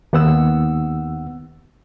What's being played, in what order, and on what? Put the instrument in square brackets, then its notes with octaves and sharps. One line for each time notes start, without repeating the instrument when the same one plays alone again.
[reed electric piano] D#2 B3 F#5 E6